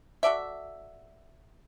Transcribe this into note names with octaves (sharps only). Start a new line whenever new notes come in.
F#4 A4 D5 E5